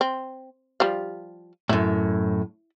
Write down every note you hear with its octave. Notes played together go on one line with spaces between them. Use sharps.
C4
F3 G3 F5
F#2 A2 E4